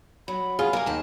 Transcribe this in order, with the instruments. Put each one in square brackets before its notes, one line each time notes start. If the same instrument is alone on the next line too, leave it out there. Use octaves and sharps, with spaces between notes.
[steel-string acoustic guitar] F#3 [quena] B5
[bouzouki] F4 [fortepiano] G#4
[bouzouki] A#3 [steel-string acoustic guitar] A#4 G#5
[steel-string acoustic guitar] D#2 A5 [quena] G5